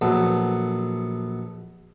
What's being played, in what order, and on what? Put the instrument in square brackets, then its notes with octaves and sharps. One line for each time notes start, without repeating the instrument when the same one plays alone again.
[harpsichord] A#1 F#3 B3 A4 A5